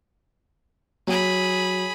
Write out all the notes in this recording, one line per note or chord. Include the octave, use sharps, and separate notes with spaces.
F#3 G#4 B5